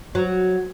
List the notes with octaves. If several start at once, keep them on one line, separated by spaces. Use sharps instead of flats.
F#3